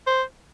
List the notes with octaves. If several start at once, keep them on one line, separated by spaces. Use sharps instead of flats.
C5